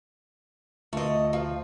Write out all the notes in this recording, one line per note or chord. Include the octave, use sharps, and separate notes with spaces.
D2 A3 F4 D#5 C#6
F3